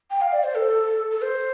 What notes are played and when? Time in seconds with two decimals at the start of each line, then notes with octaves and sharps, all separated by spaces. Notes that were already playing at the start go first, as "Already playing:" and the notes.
0.10 G5
0.21 F5
0.32 D5
0.44 C5
0.55 A4
1.11 A4
1.22 C5